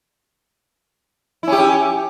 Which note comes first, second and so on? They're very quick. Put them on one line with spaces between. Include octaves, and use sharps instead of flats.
E4 C#4 G4